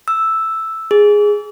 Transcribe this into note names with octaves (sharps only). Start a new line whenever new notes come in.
E6
G#4